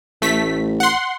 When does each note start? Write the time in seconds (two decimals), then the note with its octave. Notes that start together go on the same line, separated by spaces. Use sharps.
0.22 A1 A3 B6
0.80 F#5 C6